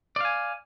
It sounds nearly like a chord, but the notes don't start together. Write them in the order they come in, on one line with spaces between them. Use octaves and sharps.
D5 F5 G#5